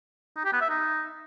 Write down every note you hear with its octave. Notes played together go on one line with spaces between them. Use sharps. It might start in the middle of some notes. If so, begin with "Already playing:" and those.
D#4
G4
B3
E5
D#4